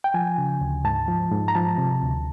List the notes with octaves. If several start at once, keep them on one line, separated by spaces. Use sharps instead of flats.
G5
F3 G#5
C#3
D2
G#2 A5
F3
G#2
A#5
F3 A5
C3
D2